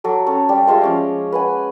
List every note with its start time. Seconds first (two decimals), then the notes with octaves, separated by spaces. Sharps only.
0.04 F#3 A4 D6
0.27 C4 C#4 A4
0.49 G3 G4 D5
0.67 G#3 F4 C5 E5
0.82 F3 C#4 D6
1.32 B4 F#5 G#5